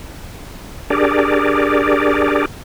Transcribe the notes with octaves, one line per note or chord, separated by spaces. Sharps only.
D4 G4 G#4 A#4 D5